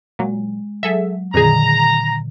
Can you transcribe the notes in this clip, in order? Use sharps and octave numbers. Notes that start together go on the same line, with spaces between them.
A#2 F#3 G#3
F#3 G#4 A4 E5
F2 A#2 D3 D#3 G#4 A#5